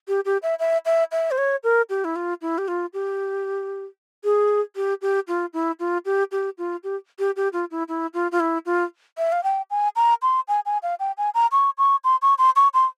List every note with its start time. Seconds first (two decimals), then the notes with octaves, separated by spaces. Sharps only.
0.08 G4
0.25 G4
0.43 E5
0.59 E5
0.86 E5
1.12 E5
1.31 C5
1.38 C#5
1.64 A#4
1.90 G4
2.05 E4
2.16 F4
2.42 E4
2.58 G4
2.68 F4
2.93 G4
4.24 G#4
4.76 G4
5.02 G4
5.28 F4
5.53 E4
5.80 F4
6.05 G4
6.32 G4
6.58 F4
6.84 G4
7.19 G4
7.36 G4
7.53 F4
7.71 E4
7.88 E4
8.14 F4
8.32 F4
8.40 E4
8.66 F4
9.18 E5
9.32 F5
9.44 G5
9.71 G#5
9.96 A#5
10.22 C6
10.48 G#5
10.66 G#5
10.83 F5
11.00 G5
11.18 G#5
11.35 A#5
11.52 C#6
11.78 C#6
12.04 C6
12.22 C#6
12.38 C6
12.56 C#6
12.74 C6